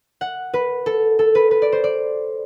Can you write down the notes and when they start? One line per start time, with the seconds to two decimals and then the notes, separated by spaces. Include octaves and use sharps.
0.21 F#5
0.54 B4
0.86 A4
1.19 A4
1.35 B4
1.51 B4
1.62 D5
1.72 C5
1.84 D5